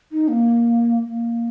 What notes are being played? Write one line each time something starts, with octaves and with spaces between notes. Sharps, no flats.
D#4
A#3
A#3